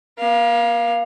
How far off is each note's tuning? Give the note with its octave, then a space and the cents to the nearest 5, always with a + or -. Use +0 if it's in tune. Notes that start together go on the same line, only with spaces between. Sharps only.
A#3 +40 F5 +0